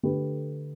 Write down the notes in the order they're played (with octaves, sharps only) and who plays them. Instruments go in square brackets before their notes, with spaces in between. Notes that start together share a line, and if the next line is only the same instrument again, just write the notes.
[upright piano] D3 A3 G4 B4